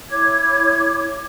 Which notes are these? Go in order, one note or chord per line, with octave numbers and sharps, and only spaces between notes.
E4 C#5 D6 G#6